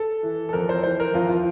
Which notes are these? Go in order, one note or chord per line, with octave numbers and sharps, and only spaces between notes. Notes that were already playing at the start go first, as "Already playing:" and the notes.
Already playing: A4
E3
A4
F2 A#4
C5
E3 C5
A#4
F2 F4
F4